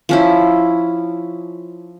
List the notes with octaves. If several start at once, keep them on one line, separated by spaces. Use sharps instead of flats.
F3 C#4 E4